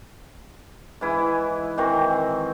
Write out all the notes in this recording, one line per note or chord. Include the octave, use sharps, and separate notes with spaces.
G#2 E3 E4 B4
D#3 E3 C4 F#4